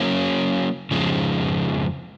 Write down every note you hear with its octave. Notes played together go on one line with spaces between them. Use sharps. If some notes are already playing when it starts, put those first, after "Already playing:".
Already playing: F#3 A#3 C#4
F2 C#3 F3 G#3